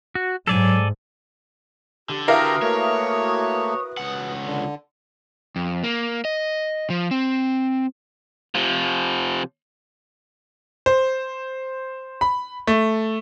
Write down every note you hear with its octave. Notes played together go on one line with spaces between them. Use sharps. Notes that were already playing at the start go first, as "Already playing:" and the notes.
F#4
G#2 F#3 A4 D5 G#5
D3 G4
E4 F#4 G4 A#4 B4 F5 A#5 D#6
A3 A#3 C#5
C#2 F#5
D3
F2
A#3
D#5
F3
C4
C3 F3
C5
B5
A3